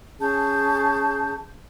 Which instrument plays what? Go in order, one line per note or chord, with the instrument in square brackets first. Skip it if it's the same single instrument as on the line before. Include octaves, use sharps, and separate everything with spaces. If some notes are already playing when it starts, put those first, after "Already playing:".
[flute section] C#4 G#4 A5 G6